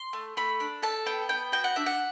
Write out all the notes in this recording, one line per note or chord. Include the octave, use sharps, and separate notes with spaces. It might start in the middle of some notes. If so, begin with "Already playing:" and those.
Already playing: C6
A3
A3 B5
D4
A4 A5
B3 G5
B3 G5
F#4 G5
F#5
D4 E5
F#5